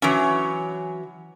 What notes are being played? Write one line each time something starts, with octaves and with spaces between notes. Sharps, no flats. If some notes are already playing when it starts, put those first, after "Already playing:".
E3 F#3 C#4